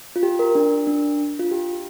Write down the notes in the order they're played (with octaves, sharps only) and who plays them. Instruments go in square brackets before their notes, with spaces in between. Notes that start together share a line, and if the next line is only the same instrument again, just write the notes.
[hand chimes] F4
G4
A#4
D4
D4
F4
G4